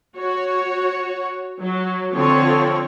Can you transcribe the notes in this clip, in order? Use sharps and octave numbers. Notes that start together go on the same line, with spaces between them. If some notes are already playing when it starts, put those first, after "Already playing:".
F#4 C#5
F#3
D3 F3 C4 C#5